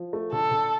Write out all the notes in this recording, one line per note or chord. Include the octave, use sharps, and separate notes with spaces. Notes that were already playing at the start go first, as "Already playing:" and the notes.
Already playing: F3
A3
D3 A4
D3